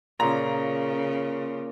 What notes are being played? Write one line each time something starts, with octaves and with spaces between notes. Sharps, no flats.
A#2 C#3 A#5